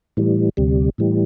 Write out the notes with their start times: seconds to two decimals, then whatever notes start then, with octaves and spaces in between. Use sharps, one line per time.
0.17 A2 E3 G3
0.57 D2 C3 G3
0.98 A2 E3 G3